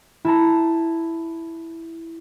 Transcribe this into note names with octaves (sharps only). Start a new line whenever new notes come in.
E4 A5 A#5